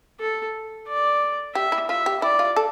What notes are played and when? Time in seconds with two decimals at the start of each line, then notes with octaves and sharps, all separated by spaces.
0.20 A4
0.87 D5
1.55 G4 E5
1.72 E4
1.89 F4 E5
2.06 G4
2.22 E4 D5
2.39 F4
2.56 A4